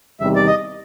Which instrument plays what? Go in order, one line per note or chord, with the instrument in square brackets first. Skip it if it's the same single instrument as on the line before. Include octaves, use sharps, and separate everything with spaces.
[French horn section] E2 C3 D#3 G3 [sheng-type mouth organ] E5
[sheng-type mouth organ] D5
D#5